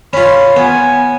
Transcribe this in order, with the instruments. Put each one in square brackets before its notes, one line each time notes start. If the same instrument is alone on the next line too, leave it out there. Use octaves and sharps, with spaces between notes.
[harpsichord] C#4 F4 [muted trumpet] B5
[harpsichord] B3 [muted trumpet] G#5